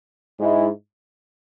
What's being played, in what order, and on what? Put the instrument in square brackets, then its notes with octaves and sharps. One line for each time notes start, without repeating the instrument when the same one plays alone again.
[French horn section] G#2 G#3 E4